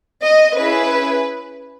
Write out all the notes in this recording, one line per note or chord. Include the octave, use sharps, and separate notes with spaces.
D#5
C#4 E4 G#4 B4